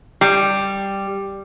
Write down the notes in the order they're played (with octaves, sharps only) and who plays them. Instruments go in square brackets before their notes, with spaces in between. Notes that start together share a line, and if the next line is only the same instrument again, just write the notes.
[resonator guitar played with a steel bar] G3